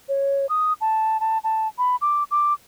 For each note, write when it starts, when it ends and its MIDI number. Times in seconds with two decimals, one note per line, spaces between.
0.09 0.46 73
0.49 0.73 87
0.81 1.20 81
1.20 1.38 81
1.44 1.68 81
1.78 1.96 83
2.01 2.24 86
2.31 2.53 86